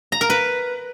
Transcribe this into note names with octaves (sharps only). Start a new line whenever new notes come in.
A#5
A#4
B4